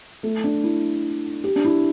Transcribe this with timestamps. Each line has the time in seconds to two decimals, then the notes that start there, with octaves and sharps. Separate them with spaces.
0.23 A3
0.44 D4
0.64 E4
1.44 G4
1.56 D4
1.65 E4